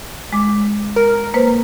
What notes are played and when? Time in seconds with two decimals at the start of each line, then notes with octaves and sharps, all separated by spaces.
0.32 G#3 D6
0.96 A#4
1.34 A#3 B4 C5